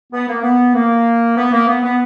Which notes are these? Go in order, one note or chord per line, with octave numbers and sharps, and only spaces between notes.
B3
A#3
B3
A#3
B3
A#3
B3
B3